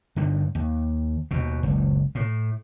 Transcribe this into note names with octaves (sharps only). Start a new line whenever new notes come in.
G2 D3 D#3
D#2
D#2 B2
F#1 C#2
A2